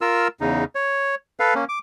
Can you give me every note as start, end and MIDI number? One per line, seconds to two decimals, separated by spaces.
0.01 0.28 65
0.01 0.28 70
0.01 0.28 88
0.41 0.64 40
0.41 0.64 49
0.41 0.64 63
0.75 1.15 73
1.40 1.54 69
1.40 1.54 71
1.40 1.54 77
1.55 1.65 58
1.55 1.65 61
1.69 1.79 86